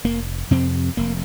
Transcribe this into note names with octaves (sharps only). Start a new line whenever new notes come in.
F1 A#3
F2 C3 C4
F1 A#3